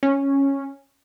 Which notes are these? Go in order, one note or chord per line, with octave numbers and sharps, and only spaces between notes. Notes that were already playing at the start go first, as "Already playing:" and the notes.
C#4